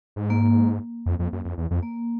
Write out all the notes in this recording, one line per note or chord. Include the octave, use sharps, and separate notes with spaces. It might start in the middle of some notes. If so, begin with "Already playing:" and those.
G#2
A#3
F2
F2
F#2
F2
E2
F2
A#3